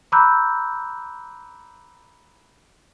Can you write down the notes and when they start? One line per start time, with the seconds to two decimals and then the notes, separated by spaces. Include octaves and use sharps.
0.12 A#5 B5 D6 E6 F#6 G6